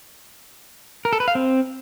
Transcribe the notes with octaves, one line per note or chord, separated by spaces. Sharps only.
A#4
A4
B4
F5
C4